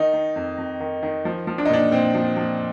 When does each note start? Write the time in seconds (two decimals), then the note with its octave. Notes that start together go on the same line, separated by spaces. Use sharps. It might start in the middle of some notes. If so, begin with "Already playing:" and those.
Already playing: D#3 D#4
0.13 D#3
0.36 F2
0.58 F2
0.80 D#3
1.03 D#3
1.25 F3
1.47 F3
1.58 D4
1.65 D#4
1.70 A#2 D4
1.91 A#2 C4
2.15 F3
2.36 F3